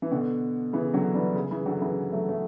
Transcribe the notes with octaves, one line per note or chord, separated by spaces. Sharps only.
E3
B2 D3
C#3 E3
D3 F#3
E3 G3
C#3
C#3 E3
D3 F#3
C#3 E3
F#3 A3
F#3 A3